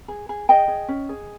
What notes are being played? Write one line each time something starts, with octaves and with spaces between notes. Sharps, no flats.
G#4
G#4
G#4 D#5 G5
G#4
C#4
G#4